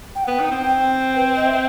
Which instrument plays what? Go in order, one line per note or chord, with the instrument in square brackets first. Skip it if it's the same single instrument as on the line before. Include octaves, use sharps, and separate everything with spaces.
[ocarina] G5
F#5
[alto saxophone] B3 [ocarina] G5
[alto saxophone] D#4
C4
[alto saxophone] C4 [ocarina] G5
[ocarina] B4
C5
D#5
E5